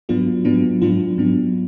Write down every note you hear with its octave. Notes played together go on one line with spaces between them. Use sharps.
G#2 F#3 B3 D4 F4
G#2 F#3 B3 D4
G#2 F#3 B3 D4 F4
G#2 F#3 B3 D4